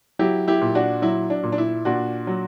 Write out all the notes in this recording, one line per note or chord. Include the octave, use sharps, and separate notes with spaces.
F#3 E4 G4
E4 G4
A#2
D4 F#4
F#3 E4
D4
A#2
D4
E4
A#2 D4 F#4
F#3